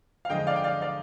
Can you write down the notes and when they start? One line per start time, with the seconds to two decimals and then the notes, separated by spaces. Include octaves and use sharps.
0.25 F5
0.30 F2 D3 G#3 D#5 G5
0.47 D5 F5
0.56 G5
0.64 D5 F5
0.82 D5 F5